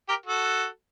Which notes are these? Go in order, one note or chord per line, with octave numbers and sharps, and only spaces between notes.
G4 A#4
F#4 A4